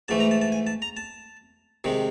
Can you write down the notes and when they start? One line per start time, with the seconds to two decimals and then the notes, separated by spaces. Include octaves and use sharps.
0.08 G#2 E3 A3 A5
0.20 A#5
0.31 A5
0.42 A5
0.52 G#5
0.67 A5
0.82 A#5
0.97 A5
1.84 C3 D#3 G#3